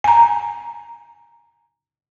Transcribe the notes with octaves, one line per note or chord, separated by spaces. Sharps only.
G#5 A#5